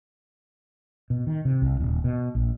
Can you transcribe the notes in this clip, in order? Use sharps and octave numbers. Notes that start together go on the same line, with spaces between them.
B2
D#3
C3
C2
D#1
B2
A#1